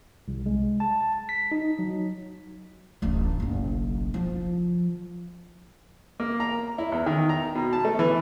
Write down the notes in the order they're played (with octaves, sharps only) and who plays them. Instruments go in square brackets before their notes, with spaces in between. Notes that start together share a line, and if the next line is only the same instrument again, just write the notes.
[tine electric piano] C2
G#3
A5
B6
D#4
F#3
[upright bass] D1 A1
F#1 B1
F3
[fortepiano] A#3
A#5
E4
E2
D#3
A#5
B2
A5
A3
E3